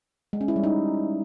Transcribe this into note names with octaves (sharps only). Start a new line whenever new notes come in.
G#3
C#4
E4
G3
D#4